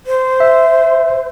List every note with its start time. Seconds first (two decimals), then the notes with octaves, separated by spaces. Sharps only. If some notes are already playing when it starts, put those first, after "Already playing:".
0.07 C5
0.40 E5